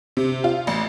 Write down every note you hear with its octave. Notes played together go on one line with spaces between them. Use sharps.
C3
F4
A1